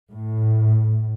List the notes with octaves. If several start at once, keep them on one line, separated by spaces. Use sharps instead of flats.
A2